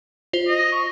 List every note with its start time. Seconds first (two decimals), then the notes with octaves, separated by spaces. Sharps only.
0.33 F4 C5
0.48 D#5
0.72 C#6